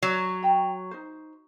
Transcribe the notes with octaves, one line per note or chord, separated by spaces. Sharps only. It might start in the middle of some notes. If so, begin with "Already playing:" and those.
F#3
G5 A#5
D#4 C5